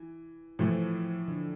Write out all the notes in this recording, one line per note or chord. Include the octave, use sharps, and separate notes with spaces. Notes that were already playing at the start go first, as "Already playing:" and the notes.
Already playing: E3
A2 E3 F3 A3
D3